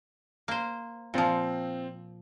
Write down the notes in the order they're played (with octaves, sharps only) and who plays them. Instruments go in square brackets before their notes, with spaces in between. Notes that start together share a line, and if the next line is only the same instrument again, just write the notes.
[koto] A#3 C5
[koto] A#2 F3 [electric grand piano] C4 F4